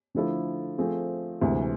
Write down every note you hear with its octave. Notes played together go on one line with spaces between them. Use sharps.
D3 F3 A3 E4 A4
F3 A3 C4 G#4
D2 C3 E3 G#3